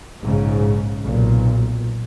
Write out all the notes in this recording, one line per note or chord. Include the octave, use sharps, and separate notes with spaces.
A#1 G#2 C#3
B1 A#2